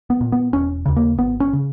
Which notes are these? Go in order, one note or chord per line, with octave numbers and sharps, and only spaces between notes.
B3
A#2
B3
E1 C#4
D#2 C#3
A#3
G#1 B3
C#4
C#3